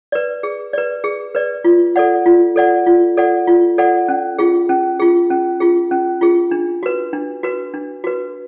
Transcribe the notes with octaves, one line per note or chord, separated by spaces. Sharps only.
B4 D5
G#4
B4 D5
G#4
B4 D5
F4
A4 D5 F#5
F4
A4 D5 F#5
F4
A4 D5 F#5
F4
A4 D5 F#5
C#4
F4 G#4
C#4
F4 G#4
C#4
F4 G#4
C#4
F4 G#4
D4
F#4 B4
D4
F#4 B4
D4
F#4 B4